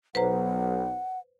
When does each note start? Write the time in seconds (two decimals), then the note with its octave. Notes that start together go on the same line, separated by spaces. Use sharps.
0.15 B1 B4 C5 F#5 A#5